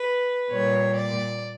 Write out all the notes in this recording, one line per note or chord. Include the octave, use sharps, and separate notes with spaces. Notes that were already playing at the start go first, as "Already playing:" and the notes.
Already playing: B4
A#2 G3 A#3 C#5
D5